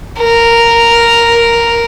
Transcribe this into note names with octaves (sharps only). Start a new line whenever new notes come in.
A#4